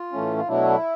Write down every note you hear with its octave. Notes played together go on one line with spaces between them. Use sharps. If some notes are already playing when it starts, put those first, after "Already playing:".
Already playing: F4
A2 E3 A3 C#4
F4
B2 F#3 A3 D4 E4